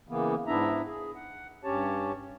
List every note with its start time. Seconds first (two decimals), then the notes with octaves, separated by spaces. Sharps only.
0.09 C#3 E3 A#3 B3
0.47 G#2 B3 D4 E4 E5 A#5
0.85 G#4
1.15 F#5
1.64 G2 C#4 G4 C#5 A5